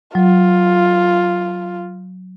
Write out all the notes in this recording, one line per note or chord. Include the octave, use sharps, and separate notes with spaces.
F#3 F4